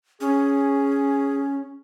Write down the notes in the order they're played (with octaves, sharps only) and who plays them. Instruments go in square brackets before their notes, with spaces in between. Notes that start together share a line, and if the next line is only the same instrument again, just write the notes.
[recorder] C#4 [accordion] G#4